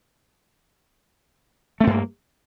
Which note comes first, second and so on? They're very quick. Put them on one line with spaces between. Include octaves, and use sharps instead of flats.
A3 C4 G2 A#3